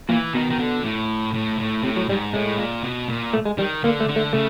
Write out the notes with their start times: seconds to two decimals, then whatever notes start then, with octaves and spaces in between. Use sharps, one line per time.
0.09 A#2 E3
0.34 B2 D#3
0.50 D#3
0.59 D3
0.84 A2
1.34 A2
1.59 A2
1.84 A2 C3
1.96 F#3
2.09 G#2 G3
2.34 A2 G#3
2.59 A#2
2.84 B2
3.09 A#2
3.33 A3
3.46 G#3
3.58 D#3 G3
3.84 D3 A#3
4.00 A3
4.08 D3
4.16 A3
4.33 C#3 A3